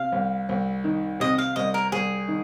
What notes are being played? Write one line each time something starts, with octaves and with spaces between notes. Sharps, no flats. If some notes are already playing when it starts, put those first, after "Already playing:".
Already playing: C3 F5
C2
C2
D#3
C3 D#5
F5
C2 D#5
A#4
C2 G#4
D#3